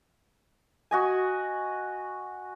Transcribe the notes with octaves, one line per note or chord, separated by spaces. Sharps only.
F#4 D#5 G#5